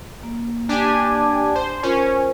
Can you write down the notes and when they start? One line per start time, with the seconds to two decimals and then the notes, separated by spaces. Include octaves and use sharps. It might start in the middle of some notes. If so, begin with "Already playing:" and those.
0.23 A#3
0.69 D4 G4 G#5
1.55 C5
1.83 C#4 F4 A#4 C5